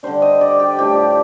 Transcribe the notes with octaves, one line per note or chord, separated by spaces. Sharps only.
D3 G3 D4 C5
D#5
D5
G4
A2 F3 A3 D4 G4